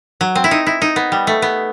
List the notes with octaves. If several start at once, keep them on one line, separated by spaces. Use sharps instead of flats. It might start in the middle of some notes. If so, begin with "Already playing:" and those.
F#3
C4
E4
D#4
E4
D#4
B3
G3
A3
B3